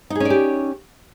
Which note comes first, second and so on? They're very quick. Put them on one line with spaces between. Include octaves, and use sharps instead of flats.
D#4 G#4 C#4 D5 G4